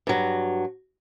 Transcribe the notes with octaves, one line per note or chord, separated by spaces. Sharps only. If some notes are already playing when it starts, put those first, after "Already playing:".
G2 F#3